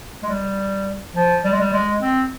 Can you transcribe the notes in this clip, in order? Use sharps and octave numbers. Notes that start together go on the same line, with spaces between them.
G#3
G3
F3
G3
G#3
G3
G#3
C4